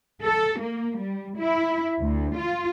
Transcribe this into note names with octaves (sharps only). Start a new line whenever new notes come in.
A4
A#3
G3
E4
D2
F4